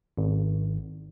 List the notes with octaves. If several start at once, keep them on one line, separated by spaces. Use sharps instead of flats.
G#1